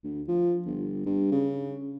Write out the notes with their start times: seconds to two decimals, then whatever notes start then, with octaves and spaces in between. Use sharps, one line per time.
0.04 D2
0.28 F3
0.66 G1
1.06 G2
1.32 C#3